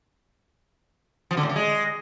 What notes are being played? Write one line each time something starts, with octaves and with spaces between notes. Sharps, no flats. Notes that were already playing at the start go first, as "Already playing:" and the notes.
F3
D3
A2
D3
G#3